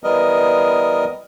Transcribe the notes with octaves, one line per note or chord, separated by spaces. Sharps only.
E3 G3 B3 A#4 D#5